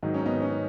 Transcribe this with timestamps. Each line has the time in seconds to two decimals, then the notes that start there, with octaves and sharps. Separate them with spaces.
0.03 G#2 D#3 F#3 D#4
0.14 C#4
0.26 B3 D#4
0.42 C#4